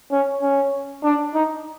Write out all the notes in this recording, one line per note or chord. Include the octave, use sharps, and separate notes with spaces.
C#4
C#4
D4
D#4